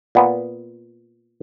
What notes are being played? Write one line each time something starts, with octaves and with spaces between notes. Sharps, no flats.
A#2 B3